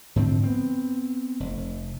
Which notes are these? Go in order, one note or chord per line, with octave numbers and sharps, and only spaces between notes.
G#2 D3 F3 C4
B3 C4
F1